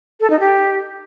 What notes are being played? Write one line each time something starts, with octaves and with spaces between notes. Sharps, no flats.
A4
D#4
G4